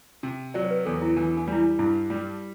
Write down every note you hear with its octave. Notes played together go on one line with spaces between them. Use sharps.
C3
F#3 D5
C5
B4
E2 A4
E4
E3 D4
D4
G3 E4
D4
G2 E4
G3